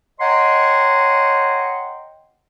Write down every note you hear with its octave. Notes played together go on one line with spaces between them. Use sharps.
C#5 D#5 F#5 G5 A#5 C6